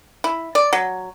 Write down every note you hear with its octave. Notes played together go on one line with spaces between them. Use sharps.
E4
D5
F#3